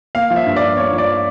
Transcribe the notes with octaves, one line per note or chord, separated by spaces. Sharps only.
A#3 F5
F3
E5
G2
G2 D5
A#3 C#5
F3
D5